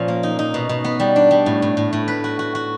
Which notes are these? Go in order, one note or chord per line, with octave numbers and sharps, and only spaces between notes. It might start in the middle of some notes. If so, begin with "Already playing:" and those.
Already playing: A#2 F3 C#4
A#3
D#4
D#4
B2
B2
B3
G3
D4
G3
A2
A2
A2
A2
B4
F#4
F#4
F#4